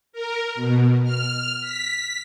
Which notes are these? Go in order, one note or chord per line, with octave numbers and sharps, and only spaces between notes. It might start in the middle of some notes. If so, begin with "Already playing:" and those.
A#4
B2
F6
B6